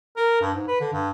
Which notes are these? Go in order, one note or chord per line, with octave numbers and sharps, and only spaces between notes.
A#4
G2
G#2
B4
D3
G2